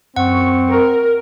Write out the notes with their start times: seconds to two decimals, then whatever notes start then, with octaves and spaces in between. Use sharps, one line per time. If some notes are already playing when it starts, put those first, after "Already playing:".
0.16 F#2 C4 F#5 C#6
0.71 A#4